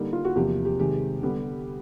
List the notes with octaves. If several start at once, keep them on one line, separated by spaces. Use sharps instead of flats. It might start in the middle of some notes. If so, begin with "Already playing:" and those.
Already playing: D3 G3 A#3 D#4
F4
F#4
E2 C3 F3 A#3 G4
G4
C3 D#3 G#3 G4
D3 G3 B3